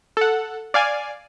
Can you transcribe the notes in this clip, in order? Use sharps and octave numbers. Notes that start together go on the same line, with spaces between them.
A4 F#5
D5 F5 G#5